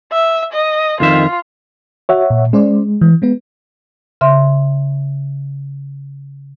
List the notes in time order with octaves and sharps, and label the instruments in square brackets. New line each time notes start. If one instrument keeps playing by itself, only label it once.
[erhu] E5
D#5
[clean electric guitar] F2 D#3 E5 [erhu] F4
[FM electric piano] F#4 [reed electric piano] C#5 E5 F#5
[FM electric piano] A#2
[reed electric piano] G#3 [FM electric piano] C#4 C5 D5
[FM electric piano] E3
G#3 B3 B4
[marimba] C#3 E5 C6